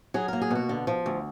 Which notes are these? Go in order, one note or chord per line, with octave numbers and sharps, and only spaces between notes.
F#3 G#4
A#3 A#4
G#4
B2 F#4
D3
F3
D2